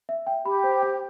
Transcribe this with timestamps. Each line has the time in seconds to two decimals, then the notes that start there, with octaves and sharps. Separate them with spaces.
0.09 E5
0.27 G5
0.45 G4 B5
0.64 C5
0.82 G5